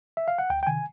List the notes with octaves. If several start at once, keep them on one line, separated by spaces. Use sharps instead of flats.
E5
F5
F#5
D2 G5
G5
C3 D#3 G#5